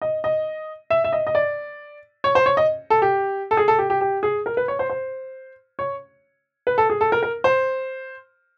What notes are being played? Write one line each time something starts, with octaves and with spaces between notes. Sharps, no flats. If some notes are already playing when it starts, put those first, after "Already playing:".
D#5
D#5
E5
E5
D#5
D#5
D5
C#5
C5
C#5
D#5
A4
G4
A4
G#4
A4
G4
G4
G4
G#4
A#4
B4
C#5
C5
C5
C#5
B4
A4
G#4
A4
A#4
A#4
C5